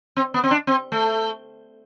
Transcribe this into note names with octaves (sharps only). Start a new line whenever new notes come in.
C4
B3
C4
D4
C4
A3